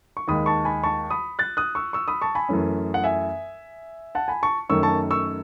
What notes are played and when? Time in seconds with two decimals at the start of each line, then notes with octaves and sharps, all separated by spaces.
0.17 C#6
0.28 D#2 D#3 G#3 B5 D#6
0.46 A5 C#6
0.65 G#5 B5
0.84 A5 C#6
1.10 B5 D#6
1.39 F#6 A6
1.57 D#6 F#6
1.75 C#6 E6
1.93 C#6 E6
2.08 B5 D#6
2.22 A5 C#6
2.35 G#5 B5
2.49 F#2 E3 A3 C#4
2.94 F#5
3.04 E5 G#5
4.15 F#5 A5
4.28 G#5 B5
4.43 A5 C#6
4.69 F#2 D#3 A3 C#4 C#6 E6
4.83 A5 C#6
5.11 C#6 E6